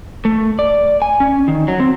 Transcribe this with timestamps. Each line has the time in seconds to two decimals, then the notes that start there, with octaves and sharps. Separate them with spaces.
0.25 A3
0.59 D5
1.02 G#5
1.20 C#4
1.48 D#3
1.68 F#3
1.80 C4